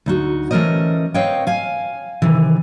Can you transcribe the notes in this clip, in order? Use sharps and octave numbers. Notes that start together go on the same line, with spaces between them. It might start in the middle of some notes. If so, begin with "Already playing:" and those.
D2 D#4 F#4
E3 A3 C#4 A#4 C5 D#5
C4 B4 C#5 D#5 F5 G5
F5 G#5
C3 D#3 E3